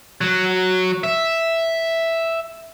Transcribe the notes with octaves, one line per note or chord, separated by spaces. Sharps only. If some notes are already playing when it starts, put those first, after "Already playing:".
F#3
E5